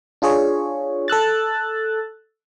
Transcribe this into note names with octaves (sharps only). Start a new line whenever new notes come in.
D4 F4 G#4 C#5
A4 E6 F#6 A6